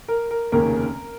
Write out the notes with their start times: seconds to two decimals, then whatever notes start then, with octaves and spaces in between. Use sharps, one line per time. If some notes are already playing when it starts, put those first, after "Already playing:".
0.08 A#4
0.31 A#4
0.52 F1 D#2 C#3 A#3 C#4 A#4